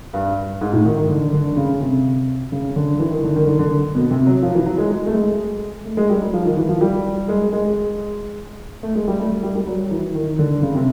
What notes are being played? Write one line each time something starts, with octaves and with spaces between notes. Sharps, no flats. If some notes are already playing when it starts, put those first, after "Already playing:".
G2
G#2
A2
D#3
D#3
D3
D3
C#3
C3
C#3
D3
E3
D#3
D3
D#3
D3
D3
B2
C3
F#3
F3
E3
F#3
G#3
G#3
A3
G#3
A3
G#3
G3
F#3
F3
D#3
E3
F3
G3
G#3
G#3
A3
G#3
G3
A3
G3
G3
F#3
E3
D#3
D3
C#3
C3